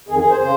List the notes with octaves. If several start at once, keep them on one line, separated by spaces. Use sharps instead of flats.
F2 D#3 G#4
G#4
C5
C#3 C5